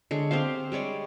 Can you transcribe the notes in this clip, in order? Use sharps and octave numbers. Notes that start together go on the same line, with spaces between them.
D3 G#3 C#5
C4 G4 C5 F5
G3 G#3 C#5 D5